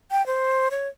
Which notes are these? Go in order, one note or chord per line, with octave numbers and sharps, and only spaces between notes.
G5
C5
C#5